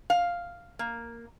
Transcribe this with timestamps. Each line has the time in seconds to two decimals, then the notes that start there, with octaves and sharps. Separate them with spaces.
0.10 F5
0.79 A#3